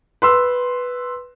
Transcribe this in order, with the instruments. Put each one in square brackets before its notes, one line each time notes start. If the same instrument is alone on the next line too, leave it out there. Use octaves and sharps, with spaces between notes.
[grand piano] B4 C6 E6